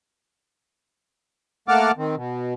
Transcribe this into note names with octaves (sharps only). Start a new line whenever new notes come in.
A3 A#3 F#5 A5 D6 F6
D#3 C4
B2